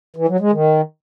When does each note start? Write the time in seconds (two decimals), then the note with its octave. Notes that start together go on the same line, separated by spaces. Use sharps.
0.16 E3
0.28 F#3
0.40 G#3
0.52 D#3